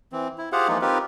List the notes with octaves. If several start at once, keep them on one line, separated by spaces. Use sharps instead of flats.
E3 C4
E4
F4 G4 G#4 C5 F5 F#5
E3 F3 G#3 A#3 D#4 F4
C4 D#4 F4 G4 A#4 B4